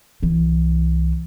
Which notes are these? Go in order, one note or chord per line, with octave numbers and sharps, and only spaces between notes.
C2 E3